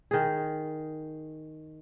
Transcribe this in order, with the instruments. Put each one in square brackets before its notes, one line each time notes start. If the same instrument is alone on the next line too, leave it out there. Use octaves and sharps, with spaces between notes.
[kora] D#3 G#4